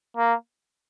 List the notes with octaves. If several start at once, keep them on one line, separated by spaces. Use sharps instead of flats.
A#3